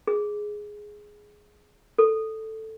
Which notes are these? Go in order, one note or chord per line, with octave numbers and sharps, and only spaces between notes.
G#4
A4